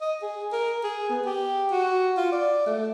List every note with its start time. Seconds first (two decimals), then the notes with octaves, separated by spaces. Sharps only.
0.01 D#5
0.22 G#4
0.53 A#4
0.84 G#4
1.09 B3
1.26 G4
1.71 F#4
2.17 F4
2.32 D5
2.66 A3